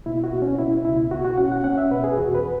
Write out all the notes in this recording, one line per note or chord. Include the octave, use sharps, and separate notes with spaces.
B2 E4
F#4
B2
C#4
B2 E4
C#2 E4
B2 F#4
F#4
C#4 F#5
F#5
C#4 F#5
E5
B2 B4
G#4
E2 F#4
B4